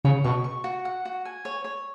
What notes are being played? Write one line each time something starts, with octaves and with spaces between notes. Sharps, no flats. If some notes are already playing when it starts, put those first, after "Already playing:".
C#3 C#5
B2 C#6
C#6
F#4
F#5
F#4
G#5
C#5
C#5